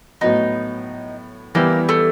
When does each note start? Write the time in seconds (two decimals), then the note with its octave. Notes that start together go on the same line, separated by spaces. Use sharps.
0.21 A2 F#3 B3 D#4
1.55 E3 G3 A#3 B3 E4 G4
1.89 A3